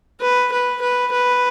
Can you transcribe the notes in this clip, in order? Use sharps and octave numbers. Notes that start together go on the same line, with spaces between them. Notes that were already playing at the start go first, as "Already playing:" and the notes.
B4
B4
B4
B4